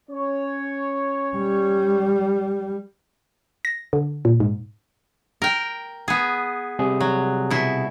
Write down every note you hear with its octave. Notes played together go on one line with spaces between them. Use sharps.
C#4 C#5
G3
A#6
D3
A#2
G#2
A#4 G5
B3 G#4
C3 G3 G#4
F#3
B2 E4